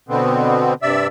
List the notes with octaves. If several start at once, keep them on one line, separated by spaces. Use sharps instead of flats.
B2 D3 B3 C4
G2 C3 D5 E5 E6